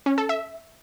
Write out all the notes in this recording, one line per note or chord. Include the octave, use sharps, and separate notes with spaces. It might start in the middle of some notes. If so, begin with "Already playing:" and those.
C#4
A4
E5